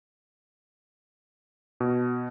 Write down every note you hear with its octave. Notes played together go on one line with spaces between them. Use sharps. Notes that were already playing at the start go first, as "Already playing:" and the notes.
B2